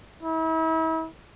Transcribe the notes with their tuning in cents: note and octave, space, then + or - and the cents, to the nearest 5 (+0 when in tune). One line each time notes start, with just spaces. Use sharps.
E4 -40